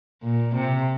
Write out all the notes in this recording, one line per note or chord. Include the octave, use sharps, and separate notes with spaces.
A#2
C3